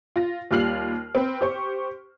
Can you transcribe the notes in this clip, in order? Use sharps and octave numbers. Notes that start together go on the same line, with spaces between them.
F4 A#6
D#2 G3 F4 F6 C7 F#7
C4 B4
G4 C5 C#6